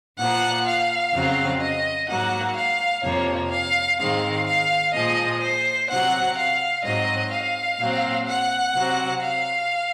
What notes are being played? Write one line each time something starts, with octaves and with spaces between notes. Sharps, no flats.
A#2 F3 A#3 F#5
F5
F2 C#3 F#3 C4
D#5
G#2 F#3 A#3 F#5
F5
F2 C3 F3 A#3 C#5
F5
G#2 D#3 G#3 C4 F5
F5
A#2 F3 G#3 D#5
C5
C3 F#3 C4 F#5
F5
G#2 F#3 C4 D#5
F5
A#2 F#3 C4
F#5
C3 F#3 C4
F5